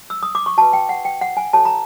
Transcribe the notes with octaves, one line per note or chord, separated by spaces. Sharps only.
E6
D#6
D6
C#6
F#4 B4 A5
G5
F#5
G5
F#5
G#5
F#4 A4 C#5 A5
A#5